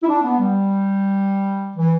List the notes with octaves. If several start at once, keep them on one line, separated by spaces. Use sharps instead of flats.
E4
D4
B3
G3
E3